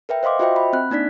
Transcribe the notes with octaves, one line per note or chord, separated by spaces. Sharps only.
A#4 B4 E5 G5
C5 D#5 F5 C6 D6
F4 F#4 C5 D#5 E5 G5
B5
C4 F#6
A#3 D4 D#4 D5 B6